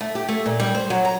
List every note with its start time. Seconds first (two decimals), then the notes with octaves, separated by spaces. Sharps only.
0.01 A3
0.15 G4
0.29 A3
0.46 A#2
0.60 G3
0.75 C5
0.90 F#3
1.05 A#5